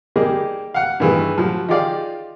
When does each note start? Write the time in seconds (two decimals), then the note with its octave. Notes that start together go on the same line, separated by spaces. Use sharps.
0.16 G3 A#3 D#4 G4 G#4
0.74 F5 F#5
1.00 G2 D#3 E3 G#3
1.38 F3 F#3
1.68 D#4 F4 G4 G#4 D5 F5